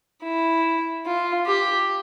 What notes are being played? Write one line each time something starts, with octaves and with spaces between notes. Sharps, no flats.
E4
F4
G4